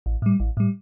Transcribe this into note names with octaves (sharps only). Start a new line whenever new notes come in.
A1
A2 G3
A1
A2 G3